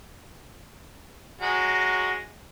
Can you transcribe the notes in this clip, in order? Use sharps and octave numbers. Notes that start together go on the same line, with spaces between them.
F#3 G#3 F#4